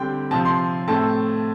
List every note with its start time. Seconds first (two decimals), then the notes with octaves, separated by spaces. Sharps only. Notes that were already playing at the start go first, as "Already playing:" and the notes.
Already playing: D3 G3 C4 G5
0.31 C3 F3 C4 A5
0.45 C6
0.88 A2 A3 C4 A5